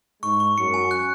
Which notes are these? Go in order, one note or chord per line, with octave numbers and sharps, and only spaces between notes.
G#2 G#3 C#6
C#6
F#2 F#3 C#7
G#5
F#6